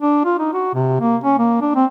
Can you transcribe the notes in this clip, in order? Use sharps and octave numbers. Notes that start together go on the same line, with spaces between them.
D4
F4
D#4
F#4
C3
A#3
C#4
A#3
D4
C4